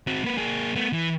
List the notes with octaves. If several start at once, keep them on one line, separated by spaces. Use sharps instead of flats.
C4 F#4
A#3 B4
A#3 G#4
A3 B3
E3